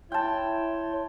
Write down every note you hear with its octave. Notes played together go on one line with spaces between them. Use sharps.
E4 C#5 G5 A5 C6